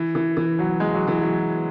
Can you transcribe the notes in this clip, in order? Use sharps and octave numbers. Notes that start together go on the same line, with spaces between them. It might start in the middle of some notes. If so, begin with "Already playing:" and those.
Already playing: E3
E3
E3
F#3
G#3
F#3
E3
F#3